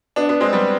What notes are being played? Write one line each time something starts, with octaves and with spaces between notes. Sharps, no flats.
B3 D4
B3 D4
G#3 C4
G3 B3